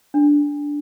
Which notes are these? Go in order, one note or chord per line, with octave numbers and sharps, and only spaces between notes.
D4